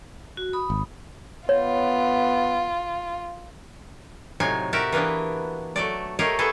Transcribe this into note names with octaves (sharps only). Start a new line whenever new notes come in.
F#4
B5 D#6
G#1
B3 F4 C#5
A2 C3 F#3 D#4 G#5
F#4 G4 A#4 D5 E5
E3 A#3 B3 D4
F#3 A3 D5
A3 G4 A#4 C#5 D#5 F5
A3 B3 E4 G#4 A4